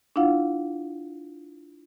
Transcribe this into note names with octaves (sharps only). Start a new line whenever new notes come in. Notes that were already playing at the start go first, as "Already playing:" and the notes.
D4 E4 F4 F5 F#5